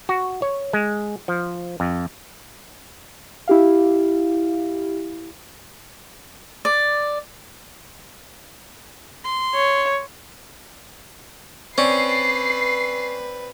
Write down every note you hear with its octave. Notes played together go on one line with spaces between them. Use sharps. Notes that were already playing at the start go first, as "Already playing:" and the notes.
F#4
C#5
G#3
F3
F2
E4 G4 F5
D5
C6
C#5
C4 C#4 B4 D5 C7